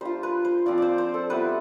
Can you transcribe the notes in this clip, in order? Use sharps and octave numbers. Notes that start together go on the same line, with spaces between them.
G3 D4 F4 C5
B4
C5
F3 C4 F4 D5
C5 D5
C5
A4
G3 B3 E4 B4